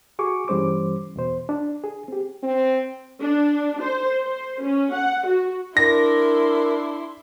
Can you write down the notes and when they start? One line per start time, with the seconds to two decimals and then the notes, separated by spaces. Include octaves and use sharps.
0.19 F#4 G#4 C#6 D6
0.48 G2 E3 G3 C#4 C5 D6
1.16 E2 B2 C5
1.49 D4
1.84 G#4
2.08 C4 G4
2.43 C4
3.21 D4
3.82 C5
4.23 C5
4.62 C#4
4.93 F#5
5.26 F#4
5.77 D4 E4 A#4 C6 A#6